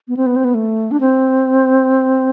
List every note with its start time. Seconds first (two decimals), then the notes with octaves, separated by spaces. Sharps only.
0.08 B3
0.17 C4
0.26 B3
0.36 C4
0.44 B3
0.54 A3
0.91 D4
1.01 C4